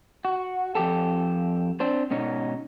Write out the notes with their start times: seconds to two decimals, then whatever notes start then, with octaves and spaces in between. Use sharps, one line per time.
0.25 F#4
0.75 F2 G#2 G4 A4
1.80 C4 D4 C5
2.10 G#2 B2 C#4 D#4